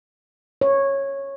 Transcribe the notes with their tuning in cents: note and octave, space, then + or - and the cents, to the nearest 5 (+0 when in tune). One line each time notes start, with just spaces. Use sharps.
C#5 -10